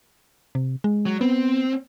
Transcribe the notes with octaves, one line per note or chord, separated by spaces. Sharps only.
C3
G#3
F#3
B3 C4